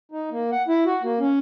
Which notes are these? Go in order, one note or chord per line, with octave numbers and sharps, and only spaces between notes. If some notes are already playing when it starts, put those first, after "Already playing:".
D#4
A#3
F#5
E4
F#4
A#3
C#4